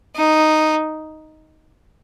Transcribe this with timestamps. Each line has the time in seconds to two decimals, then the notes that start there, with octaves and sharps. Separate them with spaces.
0.16 D#4